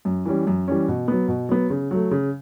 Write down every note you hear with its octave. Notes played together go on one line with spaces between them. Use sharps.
F#2
E3 G3 C#4
F#2
E3 G3 C#4
B2
F#3 B3
B2
F#3 B3
C#3
F#3 A3
C#3